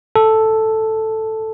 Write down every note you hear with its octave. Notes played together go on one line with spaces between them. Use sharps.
A4